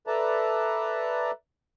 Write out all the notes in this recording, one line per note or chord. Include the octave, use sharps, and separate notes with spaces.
A4 B4 D5 E5 A5 A#5